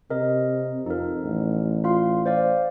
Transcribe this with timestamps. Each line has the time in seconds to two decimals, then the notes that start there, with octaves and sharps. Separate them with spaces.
0.10 C3 A#4 D#5
0.86 F2 D#4 A#4
1.24 A1
1.84 F4 F5 C6
2.26 C5 D5 F5